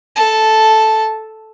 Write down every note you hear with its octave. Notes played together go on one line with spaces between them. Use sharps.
A4 A5